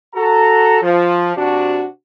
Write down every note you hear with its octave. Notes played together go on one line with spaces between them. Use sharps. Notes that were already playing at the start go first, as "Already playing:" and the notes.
F#4 A4 A#5
F3
C3 D4 F#4